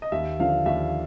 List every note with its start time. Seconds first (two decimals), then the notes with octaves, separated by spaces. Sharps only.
0.02 D#5
0.12 D#2 E5
0.39 D3 F3 F5
0.66 D#2 E5